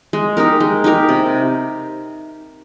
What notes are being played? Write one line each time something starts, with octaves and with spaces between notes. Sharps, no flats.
G#3
D#4 G4 A#4
G#3
D#4 G4 A#4
C3